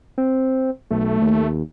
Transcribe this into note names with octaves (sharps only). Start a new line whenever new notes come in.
C4
B1 A3
D#2